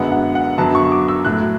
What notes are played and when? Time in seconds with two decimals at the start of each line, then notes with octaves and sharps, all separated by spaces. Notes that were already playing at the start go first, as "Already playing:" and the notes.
Already playing: F#2 D3 G#3 B3 F#5
0.12 F#5
0.35 F#5
0.58 F#2 D3 F#3 B3 A5
0.75 C#6
0.92 D6
1.08 E6
1.25 A2 F#3 A3 F#6